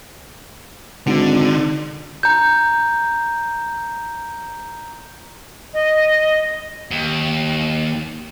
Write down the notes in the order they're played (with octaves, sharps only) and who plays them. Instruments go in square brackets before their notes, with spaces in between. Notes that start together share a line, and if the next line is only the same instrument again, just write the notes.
[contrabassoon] G#1 [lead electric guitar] D3
[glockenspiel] A#5 G6
[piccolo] D#5
[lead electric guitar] D#2